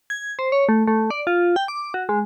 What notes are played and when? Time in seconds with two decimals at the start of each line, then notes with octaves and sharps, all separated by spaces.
0.10 G#6
0.39 C5
0.52 C#5
0.69 A3
0.88 A3
1.10 D5
1.27 F4
1.56 G5
1.68 D6
1.94 F#4
2.09 G#3